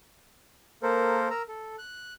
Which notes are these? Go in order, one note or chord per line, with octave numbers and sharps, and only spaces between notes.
A#3 A4 A#4 C5
A#4 A#5 E6
A4
F#6